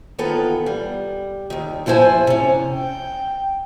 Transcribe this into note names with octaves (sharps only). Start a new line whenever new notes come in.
D#3 E3 B3 F4 A4
G3
D#2 D#3
G2 F3 E4 A#4 C5 G#5
C3 C#4
G5